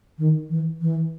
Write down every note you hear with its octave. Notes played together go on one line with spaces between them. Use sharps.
D#3
E3
E3